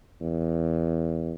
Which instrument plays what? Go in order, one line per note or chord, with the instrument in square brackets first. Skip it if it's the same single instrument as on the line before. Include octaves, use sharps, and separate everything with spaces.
[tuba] E2